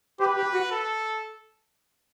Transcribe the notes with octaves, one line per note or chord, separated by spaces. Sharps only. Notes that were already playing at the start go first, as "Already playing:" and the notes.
G4 B4
G4
F#4
A4